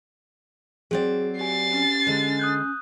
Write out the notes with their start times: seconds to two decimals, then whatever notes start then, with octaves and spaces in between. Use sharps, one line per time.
0.91 F#3 C4 G#4 D5
1.40 G4 G#5 A6 C7
1.72 C#4
2.07 D3 G#3
2.39 D#6 F#6 G6